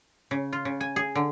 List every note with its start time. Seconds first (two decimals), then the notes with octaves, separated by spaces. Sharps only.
0.31 C#3
0.53 F4
0.65 C#3
0.81 G#5
0.96 G#4
1.15 D3